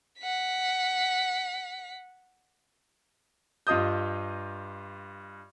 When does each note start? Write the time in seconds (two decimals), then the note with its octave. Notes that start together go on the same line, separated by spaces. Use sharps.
0.20 F#5 B6
3.67 G2 F4 D#5 D#6 G6